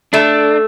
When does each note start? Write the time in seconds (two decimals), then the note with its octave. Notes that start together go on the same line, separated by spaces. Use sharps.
0.13 A3 D4